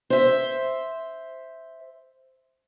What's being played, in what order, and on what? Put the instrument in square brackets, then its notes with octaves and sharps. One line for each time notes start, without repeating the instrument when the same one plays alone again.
[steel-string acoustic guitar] C5 E5